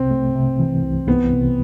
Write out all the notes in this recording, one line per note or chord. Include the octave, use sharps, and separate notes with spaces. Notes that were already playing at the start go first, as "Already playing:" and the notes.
Already playing: C2 C3 C4
A3
C3
E3
C2
C2 B3
C2